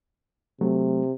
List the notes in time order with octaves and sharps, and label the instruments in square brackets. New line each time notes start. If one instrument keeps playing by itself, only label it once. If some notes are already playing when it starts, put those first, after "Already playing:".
[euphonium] C3 [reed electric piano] F#3 A3